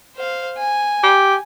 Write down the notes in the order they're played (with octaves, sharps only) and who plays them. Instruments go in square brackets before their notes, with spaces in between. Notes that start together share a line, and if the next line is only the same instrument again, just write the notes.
[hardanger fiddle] C5 F5
G#5
[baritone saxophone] G4